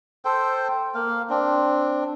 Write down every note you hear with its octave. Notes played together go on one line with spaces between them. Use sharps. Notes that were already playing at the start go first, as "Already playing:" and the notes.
A4 C5 G5
A#3 F5
C4 D4